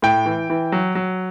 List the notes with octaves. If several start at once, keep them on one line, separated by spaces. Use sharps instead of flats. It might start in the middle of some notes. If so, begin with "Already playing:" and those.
A2 G5
E3
E3
F#3
F#3